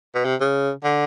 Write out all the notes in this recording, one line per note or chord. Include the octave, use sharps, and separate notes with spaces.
B2
C3
C#3
D3